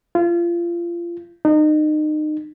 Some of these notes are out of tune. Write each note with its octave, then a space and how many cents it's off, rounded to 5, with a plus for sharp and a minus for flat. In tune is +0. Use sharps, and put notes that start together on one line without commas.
F4 -30
D#4 -30